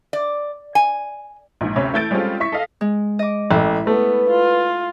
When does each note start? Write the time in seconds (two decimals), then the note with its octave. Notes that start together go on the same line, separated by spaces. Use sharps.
0.13 D5
0.75 G#5
1.61 A#1 G#2
1.76 D2 C3 C#4 C#5 B5
1.93 E3 A3 E4 G6 A6 D7
2.11 G3 G#3 C4 C#4 F4 A4
2.40 E4 E5 C#6 B6
2.52 A4 D#5 F5
2.81 G#3
3.19 D#5 D6
3.51 A1 E4
3.87 A3 B3 B4
4.29 F4